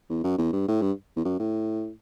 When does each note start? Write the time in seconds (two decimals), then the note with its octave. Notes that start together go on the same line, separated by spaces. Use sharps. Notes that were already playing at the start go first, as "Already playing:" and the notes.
0.09 E2
0.23 F#2
0.38 E2
0.53 G2
0.68 A2
0.82 G2
1.16 E2
1.25 F#2
1.39 A2